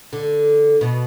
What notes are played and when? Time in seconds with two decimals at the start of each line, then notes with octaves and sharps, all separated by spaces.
0.13 D3
0.81 B2